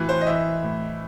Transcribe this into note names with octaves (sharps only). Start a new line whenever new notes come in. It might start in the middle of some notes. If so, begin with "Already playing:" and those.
Already playing: A2 E3 F#4 B4
C5
D#5
E3 E5
A2